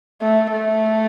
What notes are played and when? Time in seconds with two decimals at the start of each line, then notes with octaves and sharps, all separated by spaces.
0.22 A3
0.52 A3